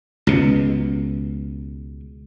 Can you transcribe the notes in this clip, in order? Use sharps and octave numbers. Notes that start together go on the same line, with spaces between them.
C#2 B2